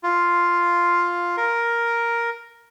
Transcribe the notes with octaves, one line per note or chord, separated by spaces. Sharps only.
F4
A#4